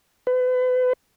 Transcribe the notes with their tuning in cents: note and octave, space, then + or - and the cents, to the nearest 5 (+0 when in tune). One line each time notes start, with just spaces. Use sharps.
B4 +35